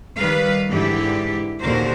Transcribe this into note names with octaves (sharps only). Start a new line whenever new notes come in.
D#3 G3 B4 F5
G#2 D3 E3 E4 G4
D#2 A#2 D3 F#4 A#4 C5